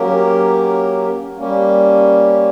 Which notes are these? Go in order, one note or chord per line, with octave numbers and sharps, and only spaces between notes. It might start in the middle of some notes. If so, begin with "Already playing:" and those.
Already playing: F#3 A#3 C#4 G4 A#4
G3 A#3 C#4